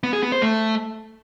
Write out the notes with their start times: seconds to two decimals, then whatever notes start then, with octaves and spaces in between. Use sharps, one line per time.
0.03 B3
0.13 G#4
0.23 B3
0.32 C5
0.42 A3